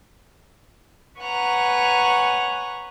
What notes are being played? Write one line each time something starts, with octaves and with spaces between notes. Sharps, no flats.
B4 C#5 F#5 G#5 A#5 F#6